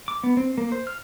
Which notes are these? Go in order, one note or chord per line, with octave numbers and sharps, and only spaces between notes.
D6
B3
C4
A#3
C5
F6